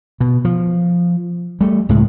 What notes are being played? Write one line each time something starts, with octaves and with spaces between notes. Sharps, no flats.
B2
F3
G3 A3
C#2 A2 G#3